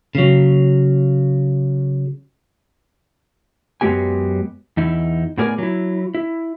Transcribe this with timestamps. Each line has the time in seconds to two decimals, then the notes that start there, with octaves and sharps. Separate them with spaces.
0.15 C#3 F#3
3.81 F#2 F#3 G#3 B3 G4 G#5
4.77 E2 D#4 E4
5.38 A2 B3 G#4 A#4 D5 G#5
5.58 F#3 E4
6.15 E4